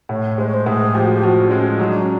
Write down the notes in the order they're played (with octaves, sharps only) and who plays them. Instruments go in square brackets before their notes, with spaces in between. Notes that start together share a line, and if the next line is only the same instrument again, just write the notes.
[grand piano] A2 [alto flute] C#5
[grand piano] G#3 [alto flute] C5
[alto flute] C#5
C5
[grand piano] A2 [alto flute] G#4
[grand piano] F3 [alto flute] G4
[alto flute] F#4
G4
[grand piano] F3 [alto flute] F#4
[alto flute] D4
[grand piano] G#3 [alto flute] C#4
[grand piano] F#3 [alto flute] D#4
[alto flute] D4
C#4